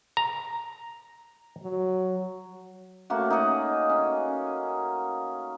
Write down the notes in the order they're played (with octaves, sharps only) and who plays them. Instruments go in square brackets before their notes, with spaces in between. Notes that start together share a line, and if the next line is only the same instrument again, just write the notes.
[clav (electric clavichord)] A#5
[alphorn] F#3
[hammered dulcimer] A3 A#3 C#4 F#4
D#4 G#4 D#5 F#5
C#4